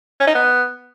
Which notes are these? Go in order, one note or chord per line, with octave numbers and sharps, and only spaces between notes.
C#4
D#4
B3